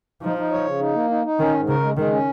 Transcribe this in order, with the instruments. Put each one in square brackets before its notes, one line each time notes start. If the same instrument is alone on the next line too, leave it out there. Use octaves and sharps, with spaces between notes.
[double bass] F3 [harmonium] D#4
[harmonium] D#4
C#5
C#3
D#4
A#3
D#4
D#4
[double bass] D#3 [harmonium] C#4
[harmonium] G#2
[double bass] C#3 [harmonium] A#4
[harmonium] G#3
[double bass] D#3 [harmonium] G#3
[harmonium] C#4